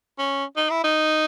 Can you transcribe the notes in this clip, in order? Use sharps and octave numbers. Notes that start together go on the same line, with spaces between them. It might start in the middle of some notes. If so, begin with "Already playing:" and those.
C#4
D#4
E4
D#4